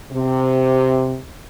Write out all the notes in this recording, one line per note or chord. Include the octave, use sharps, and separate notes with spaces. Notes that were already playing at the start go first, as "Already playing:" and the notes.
C3